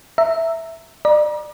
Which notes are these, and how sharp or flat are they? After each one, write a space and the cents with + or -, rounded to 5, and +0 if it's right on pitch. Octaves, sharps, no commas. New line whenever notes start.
E5 +0 A#5 -20
D5 +35 A#5 +40